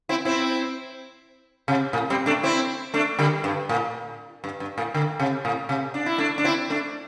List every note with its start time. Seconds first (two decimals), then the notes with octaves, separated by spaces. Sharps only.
0.09 C4 E4
0.25 C4 E4
1.68 C3
1.93 A2
2.10 G3 C4
2.26 A3 D4
2.43 C4 E4
2.94 A3 D4
3.19 D3 G3
3.44 G2
3.69 A2
4.44 G2
4.60 G2
4.78 A2
4.94 D3
5.19 C3
5.45 A2
5.69 C3
5.94 D4
6.06 E4
6.18 A3 D4
6.38 D4
6.44 C4 E4
6.70 A3 D4